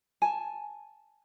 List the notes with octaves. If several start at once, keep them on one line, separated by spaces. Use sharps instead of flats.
G#5 A5